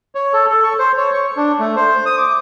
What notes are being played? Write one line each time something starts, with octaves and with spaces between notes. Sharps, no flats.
C#5
A4
A4
C#6
C5
C#5
C#6
D4
A3
C5
D#6
D6